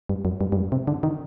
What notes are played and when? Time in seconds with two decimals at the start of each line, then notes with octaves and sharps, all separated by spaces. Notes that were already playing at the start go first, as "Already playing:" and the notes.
0.09 G2
0.25 F#2
0.41 G2
0.52 G2
0.56 F#2
0.72 C3
0.88 D3
1.03 D#3